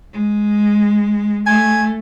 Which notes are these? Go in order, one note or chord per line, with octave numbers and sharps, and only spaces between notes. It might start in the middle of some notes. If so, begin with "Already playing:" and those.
G#3
A3 G#5